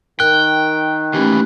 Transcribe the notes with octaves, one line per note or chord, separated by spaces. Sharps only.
D#3 A#4 G5 F#6
D#2 E3 A3 C#4 G4